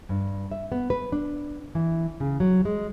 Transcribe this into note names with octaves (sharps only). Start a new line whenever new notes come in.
G2
E5
B3
B4
D4
E3
C#3
F#3
G#3